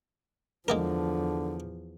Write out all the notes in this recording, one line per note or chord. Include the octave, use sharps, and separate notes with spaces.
E2 D3 F3 G#3 A#3 A#4